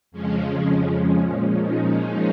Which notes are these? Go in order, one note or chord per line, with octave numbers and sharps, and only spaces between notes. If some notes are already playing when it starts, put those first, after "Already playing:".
F2 C#3 F3 G#3 C#4
A#2 F3 G#3
D#4